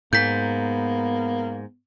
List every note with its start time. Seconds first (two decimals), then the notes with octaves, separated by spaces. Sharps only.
0.13 G#2 A#3 B3 G6 B6